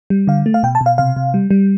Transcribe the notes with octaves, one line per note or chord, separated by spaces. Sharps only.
G3
D3 F5
A3
F5
B2 G5
A5
B2
F5
C3 F5
C3
G3
G3